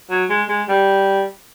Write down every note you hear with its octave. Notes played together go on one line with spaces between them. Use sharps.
F#3
G#3
G#3
G3